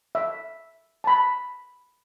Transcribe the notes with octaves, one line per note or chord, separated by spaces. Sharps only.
E5
A5 B5